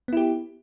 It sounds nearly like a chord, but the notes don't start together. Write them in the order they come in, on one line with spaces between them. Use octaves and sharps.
B3 E4 G4